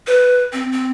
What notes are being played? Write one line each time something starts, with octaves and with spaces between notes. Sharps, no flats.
B4
C4
C4